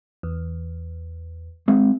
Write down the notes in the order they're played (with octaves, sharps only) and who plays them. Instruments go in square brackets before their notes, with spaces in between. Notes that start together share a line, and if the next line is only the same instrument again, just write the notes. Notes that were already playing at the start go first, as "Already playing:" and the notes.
[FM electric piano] E2
[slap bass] G#3 C4